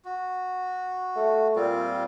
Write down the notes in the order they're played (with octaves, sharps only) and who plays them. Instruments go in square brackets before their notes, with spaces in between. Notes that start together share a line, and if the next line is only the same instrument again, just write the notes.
[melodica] F#4
[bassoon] A3
[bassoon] A#2 [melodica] G3 C4 F4